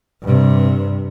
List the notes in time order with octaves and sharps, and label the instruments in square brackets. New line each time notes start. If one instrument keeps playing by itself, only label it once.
[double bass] G2 C3